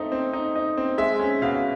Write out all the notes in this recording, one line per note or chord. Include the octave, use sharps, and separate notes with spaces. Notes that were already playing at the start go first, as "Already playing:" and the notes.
Already playing: A3 C4 D#4
C4
D#4
D#4
C4
G#3 E5
C#4
B2 F5